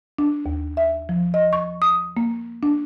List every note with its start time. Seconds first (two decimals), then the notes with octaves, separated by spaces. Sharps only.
0.18 D4
0.46 D#2
0.77 E5
1.09 F3
1.34 D#5
1.53 C#6
1.82 D#6
2.17 A#3
2.63 D4